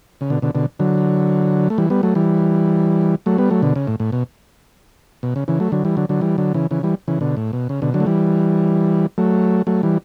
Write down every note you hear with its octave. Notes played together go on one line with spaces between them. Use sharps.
C#3
B2 D3
B2 D3
B2 D3
D3 F#3
A3
E3 G3
G3 B3
F#3 A3
E3 G3
F#3 A3
G3 B3
F#3 A3
B2 D3
C#3
A2
A2
B2
B2
C#3
C#3 E3
F#3 A3
D3 F#3
E3 G3
D3 F#3
D3 F#3
E3 G3
D3 F#3
C#3 E3
C#3 E3
E3 G3
C#3 E3
B2 D3
A2
B2
C#3
B2 D3
D3 F#3
A3
E3 G3
F#3 A3
F#3 A3
E3 G3